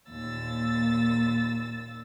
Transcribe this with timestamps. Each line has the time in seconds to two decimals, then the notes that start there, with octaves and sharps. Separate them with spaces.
0.10 D#2 A#2 E6 A6